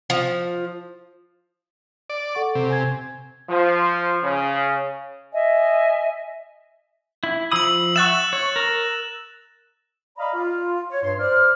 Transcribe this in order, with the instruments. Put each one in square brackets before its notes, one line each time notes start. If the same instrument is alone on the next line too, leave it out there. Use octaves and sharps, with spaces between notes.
[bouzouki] F3
[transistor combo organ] D5
[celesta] A4 F#5 C#6
[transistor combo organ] C3
[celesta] G#5 G#6
[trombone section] F3
C#3
[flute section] D#5 E5 G#5
[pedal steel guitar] E4
[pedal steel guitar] F3 B5 D#6 [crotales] E6 F#7
[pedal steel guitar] E5 F#5 C#6 [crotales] F#6 A6 E7
[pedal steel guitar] C#5
A#4
[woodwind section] D5 D#5 F5 A#5 B5
F4
C#5
G2 C6
C5 D5 F6